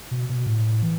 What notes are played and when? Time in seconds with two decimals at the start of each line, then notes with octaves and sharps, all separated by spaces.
0.11 B2
0.29 B2
0.46 A2
0.82 E3